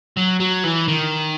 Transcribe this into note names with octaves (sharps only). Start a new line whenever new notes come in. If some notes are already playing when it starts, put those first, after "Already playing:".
F#3
F#3
E3
D#3